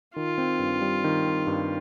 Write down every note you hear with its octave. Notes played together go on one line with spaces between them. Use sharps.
D#3 F4
C4
G2
G3
D#3
C4
G2